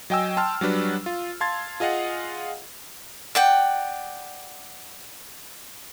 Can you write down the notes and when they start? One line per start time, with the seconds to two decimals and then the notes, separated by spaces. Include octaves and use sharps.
0.10 F#3 D#5 G5 G#5 E6
0.37 G5 A5 C6 F6
0.61 F#3 G3 D4 B4
1.06 F4
1.41 F5 A5 C6 G#6 A6
1.80 F4 G#4 D#5 F5 F#5
3.35 D5 F#5 G5